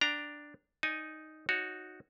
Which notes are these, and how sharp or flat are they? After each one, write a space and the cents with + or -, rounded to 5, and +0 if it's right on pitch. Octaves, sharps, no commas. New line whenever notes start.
D4 +0 G5 +0 A#5 +0
D#4 +0 D5 -15 G#5 +0
D#4 +0 F#4 -5 C#5 +0